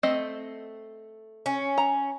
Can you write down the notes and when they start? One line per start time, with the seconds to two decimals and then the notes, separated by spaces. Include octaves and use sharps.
0.03 A3 C4 D#5
1.46 C#4
1.78 A#5